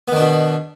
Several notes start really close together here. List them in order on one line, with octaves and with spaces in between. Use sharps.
B3 D#3 D4 B2